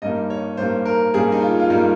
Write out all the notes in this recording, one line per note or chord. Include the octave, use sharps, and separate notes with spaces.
G2 G3 A#3 D#4 D#5
C#5
G2 G3 A#3 D#4 C5
A#4
G2 G3 A#3 D#4 G#4
D#4
F4
F4
G2 G3 A#3 D#4